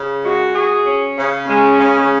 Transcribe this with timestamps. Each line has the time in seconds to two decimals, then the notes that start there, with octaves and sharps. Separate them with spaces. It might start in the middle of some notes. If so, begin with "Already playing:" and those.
Already playing: C#3
0.24 G#3 F#4
0.54 G#4
0.86 C#4
1.17 C#3
1.47 G#3 C#4
1.78 C#3